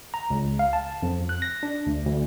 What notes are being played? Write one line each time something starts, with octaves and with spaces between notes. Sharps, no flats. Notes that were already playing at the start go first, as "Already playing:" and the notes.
A#5
C#2
F5
A5
F2
F#6
A#6
D4
D2
D2